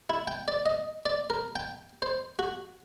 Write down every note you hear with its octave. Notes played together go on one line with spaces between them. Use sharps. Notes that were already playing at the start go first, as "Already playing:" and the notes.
E4
G5
D5
D#5
D5
A#4
G5
C5
F#4